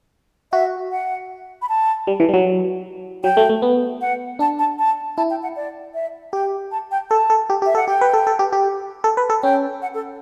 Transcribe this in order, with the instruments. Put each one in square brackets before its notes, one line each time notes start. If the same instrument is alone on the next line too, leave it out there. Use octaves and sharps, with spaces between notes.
[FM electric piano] F#4 [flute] E5
[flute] F#5
B5
A5
[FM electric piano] G3
E3
G3
F#3
[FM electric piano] F#3 [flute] G5
[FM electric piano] A3
A3
B3
[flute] F#5
[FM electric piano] D4 [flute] A5
[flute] A5
A5
[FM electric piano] E4 [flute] A5
[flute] G5
F#5
D5
E5
[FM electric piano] G4 [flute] G5
[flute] A5
G5
[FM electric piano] A4 [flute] A5
[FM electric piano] A4
G4
G4
[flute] E5
[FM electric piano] A4 [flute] F#5
[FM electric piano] G4 [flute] G5
[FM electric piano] B4
A4
A4
G4
G4
A4
B4
A4
[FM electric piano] C#4 [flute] G5
[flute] F#5
A4